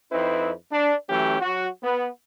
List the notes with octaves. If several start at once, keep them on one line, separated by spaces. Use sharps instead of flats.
F2 C4 D#4 E4 B4
D4
E3 F#3 A3 C#4 G4
F#3 F#4
B3